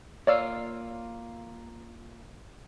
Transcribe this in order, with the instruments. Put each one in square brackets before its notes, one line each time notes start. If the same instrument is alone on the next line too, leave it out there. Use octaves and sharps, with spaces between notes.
[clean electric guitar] A#3 F4 F5 [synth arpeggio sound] C#5 D5 E6